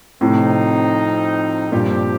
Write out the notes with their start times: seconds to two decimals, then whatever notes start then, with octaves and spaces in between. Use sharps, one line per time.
0.21 A2 C3 F3 C4 D#4
1.72 G2 A#2 F3 C4 G4